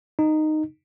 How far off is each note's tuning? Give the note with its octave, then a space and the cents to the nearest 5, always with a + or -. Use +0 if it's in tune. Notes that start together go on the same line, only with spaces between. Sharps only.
D#4 -10